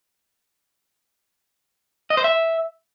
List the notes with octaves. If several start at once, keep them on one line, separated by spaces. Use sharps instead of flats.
D#5
C5
E5